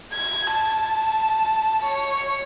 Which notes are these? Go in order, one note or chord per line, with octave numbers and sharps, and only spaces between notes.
G#6
A5
C#5